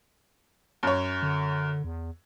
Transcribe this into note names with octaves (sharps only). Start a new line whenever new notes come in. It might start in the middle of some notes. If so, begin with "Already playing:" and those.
F#2 C#5
D3
E2